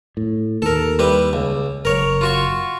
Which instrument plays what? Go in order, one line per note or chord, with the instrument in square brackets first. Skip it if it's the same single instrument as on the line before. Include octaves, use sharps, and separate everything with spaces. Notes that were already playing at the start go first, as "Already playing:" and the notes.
[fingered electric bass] A2
[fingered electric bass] D#2 [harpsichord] A4 A#4
[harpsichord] G3 E4 B4
C#2
[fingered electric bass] F#1 [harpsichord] A#4 C#5
[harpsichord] F4 F#4 C#6